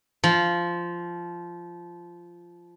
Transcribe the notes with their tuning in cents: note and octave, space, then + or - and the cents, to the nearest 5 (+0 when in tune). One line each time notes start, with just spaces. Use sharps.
F3 -10